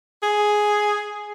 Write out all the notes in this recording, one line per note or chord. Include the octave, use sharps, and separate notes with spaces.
G#4